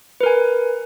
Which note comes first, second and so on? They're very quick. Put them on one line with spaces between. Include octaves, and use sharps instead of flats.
B4 A#4 G#5